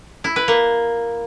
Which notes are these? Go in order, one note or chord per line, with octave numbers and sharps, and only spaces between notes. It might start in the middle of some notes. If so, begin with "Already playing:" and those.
E4
B4
A#3